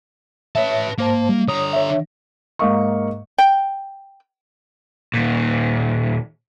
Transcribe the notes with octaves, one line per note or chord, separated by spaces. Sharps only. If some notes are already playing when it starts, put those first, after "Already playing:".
B4 C#5 E5 A5
G#2 A#3 C5 A5
G3
D3 C#5 A#5 D#6
C#5 E5
G#2 A#3 D#5 F5 C#6
G5
D#2 A#2